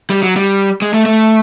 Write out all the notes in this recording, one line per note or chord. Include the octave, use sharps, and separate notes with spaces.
G3
F#3
G3
G#3
A3
A3